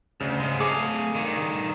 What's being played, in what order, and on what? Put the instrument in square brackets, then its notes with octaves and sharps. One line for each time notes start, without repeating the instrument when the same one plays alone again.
[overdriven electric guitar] D2 [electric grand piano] C#3
[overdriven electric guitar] G#2 G#3
[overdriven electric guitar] A3 F5 [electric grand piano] G#4 D6
[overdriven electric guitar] G2 D#3